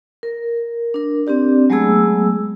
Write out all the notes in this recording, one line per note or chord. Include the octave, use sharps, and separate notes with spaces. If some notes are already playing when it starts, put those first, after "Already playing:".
A#4
D4 A#4
C4 D4 G4 D5
F#3 G#3 A3 B3 G#4 E6